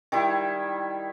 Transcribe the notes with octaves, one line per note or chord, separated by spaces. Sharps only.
D#3 G3 E4